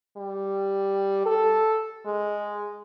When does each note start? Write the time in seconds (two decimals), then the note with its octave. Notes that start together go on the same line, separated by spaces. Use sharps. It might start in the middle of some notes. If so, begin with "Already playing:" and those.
0.17 G3
1.26 A4
2.06 G#3